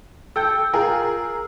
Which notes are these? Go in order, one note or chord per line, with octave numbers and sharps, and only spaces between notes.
A4 G5 E6 G6
F4 G#4 A#4